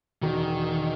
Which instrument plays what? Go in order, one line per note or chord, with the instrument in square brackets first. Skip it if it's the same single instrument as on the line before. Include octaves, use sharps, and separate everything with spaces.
[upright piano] E1 [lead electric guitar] D#3